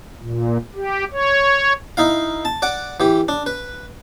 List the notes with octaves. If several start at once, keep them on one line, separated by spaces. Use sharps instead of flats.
A#2
G4
C#5
D#4 E4 F5
A5
D5 F#5 D6
E3 G4
D4
B4